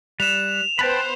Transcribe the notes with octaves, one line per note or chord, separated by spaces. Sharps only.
G3 F#6 E7 F7
B3 C5 G5 A5 B5 F#6